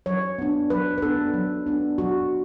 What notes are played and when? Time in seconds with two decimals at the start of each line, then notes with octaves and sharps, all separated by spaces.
0.06 F#3 C#5
0.38 B3 D4
0.70 F#3 B4
0.98 B4
1.02 B3 D4 A4
1.34 F#3
1.66 B3 D4
1.98 F#3 F#4